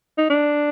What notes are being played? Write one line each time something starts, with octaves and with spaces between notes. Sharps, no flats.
D#4
D4